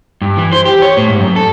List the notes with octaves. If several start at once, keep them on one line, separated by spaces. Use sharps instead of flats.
G2
E3
C5
G4
C#5
A2
G#2
F#2
A4